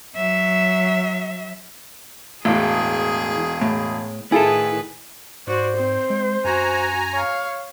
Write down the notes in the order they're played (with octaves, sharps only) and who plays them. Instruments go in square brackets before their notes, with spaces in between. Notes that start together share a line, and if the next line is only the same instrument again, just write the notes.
[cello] F#3 E5
[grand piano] E1 [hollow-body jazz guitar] A2 E3 [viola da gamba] G#4 [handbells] F5
[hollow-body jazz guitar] A2
[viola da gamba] A2 D#3 B4 [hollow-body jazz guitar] E4 F4 A4 [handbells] G#4 G#5
[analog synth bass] G#2 [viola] F#4 D5 [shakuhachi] C5
[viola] C4
[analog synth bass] G#3
[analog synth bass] F#2 [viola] F#4 [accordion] G#5 A#5
[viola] C#5 F5